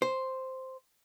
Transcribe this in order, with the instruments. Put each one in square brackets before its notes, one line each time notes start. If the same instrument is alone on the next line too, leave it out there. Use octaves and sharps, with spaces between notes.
[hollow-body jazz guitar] C5